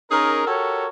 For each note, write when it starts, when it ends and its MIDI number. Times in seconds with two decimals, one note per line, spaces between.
0.11 0.46 61
0.11 0.46 63
0.11 0.46 68
0.11 0.46 70
0.47 0.88 66
0.47 0.88 67
0.47 0.88 69
0.47 0.88 70
0.47 0.88 73